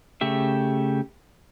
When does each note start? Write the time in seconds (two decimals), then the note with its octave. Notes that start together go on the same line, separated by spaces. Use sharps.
0.21 C#3 A3 G4 E5